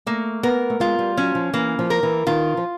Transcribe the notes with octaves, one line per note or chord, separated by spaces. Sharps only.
A3 A#3
B3 A#4
A3
G#3 F4
G3
F#3 C#4
F3
E3 A#3
F3
A#4
E3
D#3 F4
F3